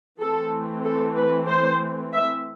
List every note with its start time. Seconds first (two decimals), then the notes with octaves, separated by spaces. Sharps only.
0.20 E3 A3 C4 A4
0.84 A4
1.16 B4
1.48 C5
2.13 E5